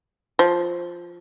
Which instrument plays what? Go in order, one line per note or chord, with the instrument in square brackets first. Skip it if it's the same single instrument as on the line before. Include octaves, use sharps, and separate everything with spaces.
[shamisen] F3